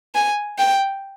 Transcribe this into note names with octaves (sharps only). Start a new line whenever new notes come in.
G#5
G5